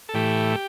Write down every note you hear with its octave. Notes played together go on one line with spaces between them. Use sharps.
A4
A2 E3 A3 G4